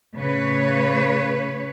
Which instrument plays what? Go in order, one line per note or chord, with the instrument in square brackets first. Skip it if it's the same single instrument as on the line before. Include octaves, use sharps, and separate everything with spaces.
[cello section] A2 C#3 B4 C#5